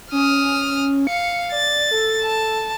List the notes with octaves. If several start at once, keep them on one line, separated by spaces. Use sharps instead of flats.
C#4 D#6 F6
F5 C#7
D5 A6
A4
A5